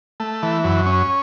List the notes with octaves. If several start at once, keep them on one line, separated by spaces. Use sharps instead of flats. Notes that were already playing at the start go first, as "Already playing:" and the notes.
A3
E3
F#2
C#4